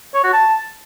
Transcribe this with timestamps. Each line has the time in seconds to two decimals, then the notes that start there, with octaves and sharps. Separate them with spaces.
0.14 C#5
0.24 F#4
0.33 A5